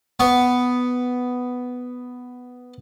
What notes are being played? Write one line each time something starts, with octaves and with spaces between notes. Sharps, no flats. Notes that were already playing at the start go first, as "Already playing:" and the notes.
B3 C#6